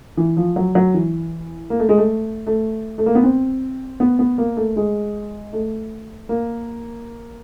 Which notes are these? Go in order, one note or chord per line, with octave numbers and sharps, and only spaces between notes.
E3
F3
F#3
F#3
E3
A#3
A3
G#3
A3
A3
A3
A#3
B3
C4
B3
B3
A#3
A3
G#3
A3
A#3